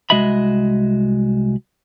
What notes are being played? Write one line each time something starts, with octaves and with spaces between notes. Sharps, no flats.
C2 G#3 F#4 D#5 E5 B5